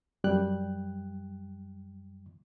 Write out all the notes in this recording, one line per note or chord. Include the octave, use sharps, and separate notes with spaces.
F#2 G3 G5 F#6